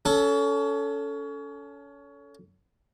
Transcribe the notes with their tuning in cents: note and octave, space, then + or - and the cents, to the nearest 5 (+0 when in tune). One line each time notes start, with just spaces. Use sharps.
C#4 +25 A4 +0